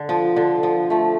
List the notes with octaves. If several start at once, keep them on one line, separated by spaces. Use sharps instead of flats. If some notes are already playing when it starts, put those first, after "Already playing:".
Already playing: D3
F3
D3
F3
F3 A3